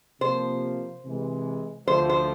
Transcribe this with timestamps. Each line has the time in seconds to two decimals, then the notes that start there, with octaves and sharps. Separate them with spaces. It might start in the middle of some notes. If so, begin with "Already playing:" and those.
0.21 C3 F3 A#3 C5
1.04 C3 E3 G#3
1.87 D2 D3 F3 A3 C5
2.09 C5